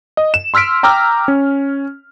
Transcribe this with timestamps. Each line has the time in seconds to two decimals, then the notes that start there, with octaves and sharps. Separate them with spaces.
0.17 D#5
0.34 E7
0.54 C6 E6 F6 B6 D7
0.83 G5 A#5 D6 E6 F6
1.28 C#4